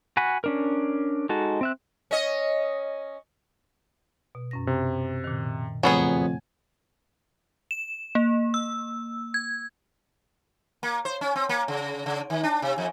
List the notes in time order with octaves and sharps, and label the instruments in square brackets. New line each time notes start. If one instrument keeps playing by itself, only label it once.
[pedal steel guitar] F#4 F#5 G#5 B5
C#4 D4 A#4
G#3 D#4 F#4 A4
C4 E5 F#6
[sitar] C#4 D#5
[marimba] B2
F#2 C#4 A#6
[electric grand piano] C3
[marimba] A#2 D#3
[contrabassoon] F2 [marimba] C#3 A3 [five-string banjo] F#3 B3 G#4 [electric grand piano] G#5
[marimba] F#5
[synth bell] E7
A#3
E6
G#6
[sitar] A#3
C5
C#4
C4
A#3
C#3
C#3
D#3
D4
C3
F2